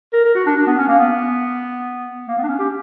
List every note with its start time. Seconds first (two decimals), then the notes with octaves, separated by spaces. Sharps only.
0.13 A#4
0.25 A#4
0.35 F#4
0.46 D4
0.57 D4
0.67 B3
0.78 C#4
0.88 A#3
0.99 B3
2.28 A#3
2.38 B3
2.43 D4
2.48 C#4
2.59 G4